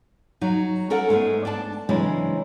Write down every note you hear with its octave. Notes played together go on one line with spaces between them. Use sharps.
F#3 D#4
C#4 A4 A#4 F#5
G#2 G#3 A3 B3
D4 G5 A5
C#3 E3 F#3 G#3 C4 D4